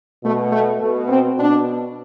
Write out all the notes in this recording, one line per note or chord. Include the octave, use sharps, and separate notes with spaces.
B2 A3
A3
B2 A3
C4
B2 D4